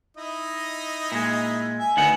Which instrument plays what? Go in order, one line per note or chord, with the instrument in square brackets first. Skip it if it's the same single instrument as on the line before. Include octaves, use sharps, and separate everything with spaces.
[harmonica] D#4 E4 D#5
[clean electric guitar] A#2 G#3
[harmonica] E5 [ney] G#5
[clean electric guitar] D2 D#3 F#5 [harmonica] B3